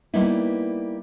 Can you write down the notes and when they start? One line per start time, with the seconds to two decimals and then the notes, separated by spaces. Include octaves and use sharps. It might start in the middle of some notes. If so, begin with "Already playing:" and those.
0.14 G3 A#3 B3 D#4 E4